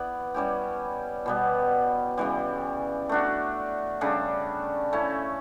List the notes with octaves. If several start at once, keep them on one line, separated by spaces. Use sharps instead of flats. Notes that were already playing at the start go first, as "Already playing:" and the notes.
Already playing: B3 E4 B4 D5
G3 C#4 E4 G4
B2 G3 B3
C#3 E3 G3
A3 D4 F#4
C#3 G3 D4 A4
A3 C#4 E4